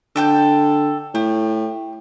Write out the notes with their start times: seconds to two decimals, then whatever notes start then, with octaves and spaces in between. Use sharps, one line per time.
0.16 D3 A4 G5 G6
1.15 A2 G4